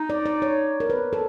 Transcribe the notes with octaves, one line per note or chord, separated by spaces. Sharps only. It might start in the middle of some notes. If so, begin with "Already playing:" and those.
Already playing: D#4
D5
D5
C#5
A#4
B4
A4